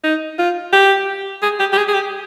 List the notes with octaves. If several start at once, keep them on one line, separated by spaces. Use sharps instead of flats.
D#4
F4
G4
G#4
G4
G4
G#4
G#4
G4